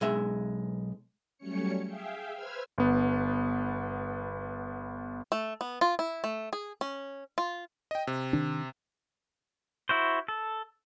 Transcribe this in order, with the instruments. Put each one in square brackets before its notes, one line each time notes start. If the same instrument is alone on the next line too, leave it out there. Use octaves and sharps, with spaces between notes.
[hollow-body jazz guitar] B1 G#3 E5
[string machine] F#3 G3 A3 C#4 C#5 C#7
G#4 E5 F5 G5
B4 C5 E6 F6 G#6
[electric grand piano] G1 B3
[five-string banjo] A3
B3
F4
E4
A3
G#4
C#4
F4
[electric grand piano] D#5 G5
C3
[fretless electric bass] D#3 D4
[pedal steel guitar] E4 F#4 C5
A4